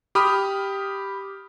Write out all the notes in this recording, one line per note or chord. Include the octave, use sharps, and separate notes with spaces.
G4 B5 D#6 F6